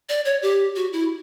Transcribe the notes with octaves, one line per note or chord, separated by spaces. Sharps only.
D5
C#5
G4
F#4
E4